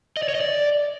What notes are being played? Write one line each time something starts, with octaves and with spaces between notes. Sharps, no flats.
D#5
D5
C#5
D#5
D5